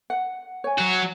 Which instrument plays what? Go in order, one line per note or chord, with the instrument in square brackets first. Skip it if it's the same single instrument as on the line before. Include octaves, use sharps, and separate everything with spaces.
[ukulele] F#5
C#5 G#5
[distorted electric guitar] F#3 F#4